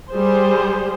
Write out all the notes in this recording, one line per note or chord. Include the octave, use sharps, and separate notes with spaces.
G3 G#4 C5